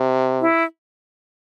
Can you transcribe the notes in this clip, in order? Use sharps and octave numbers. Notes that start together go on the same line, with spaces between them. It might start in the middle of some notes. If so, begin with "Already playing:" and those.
Already playing: C3
E4